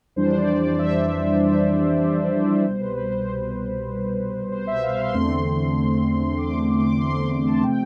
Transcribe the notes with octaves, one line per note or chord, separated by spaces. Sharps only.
F2 E3 G3 D4 C5
D5
D5
D5
E5
E5
C2 B2 G3 C5
B4
C5
C5
C5
E5
F5
C6
E2 D3 A3 C4 C6
D6
C6
D6
C6
D6
C6
A5
C3 F3 A3 C4 G5